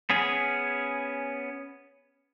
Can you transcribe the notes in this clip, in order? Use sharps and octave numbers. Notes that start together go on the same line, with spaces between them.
B3 C#4 G#4